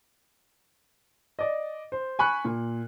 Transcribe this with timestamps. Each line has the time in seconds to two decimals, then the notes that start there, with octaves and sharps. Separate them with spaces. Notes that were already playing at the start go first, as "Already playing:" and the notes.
1.39 D5 D#5
1.92 C5
2.19 G#5 B5 C#6 F#6
2.45 A#2